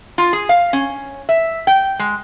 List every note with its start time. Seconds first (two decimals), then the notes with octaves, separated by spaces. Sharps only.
0.18 F4
0.33 G#4
0.49 F5
0.73 C#4
1.29 E5
1.67 G5
1.99 G#3